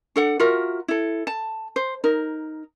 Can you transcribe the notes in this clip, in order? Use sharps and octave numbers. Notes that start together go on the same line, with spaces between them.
D4 A4 F#5
F4 F#4 A#4 E5
E4 A4
A5
C5
D#4 A#4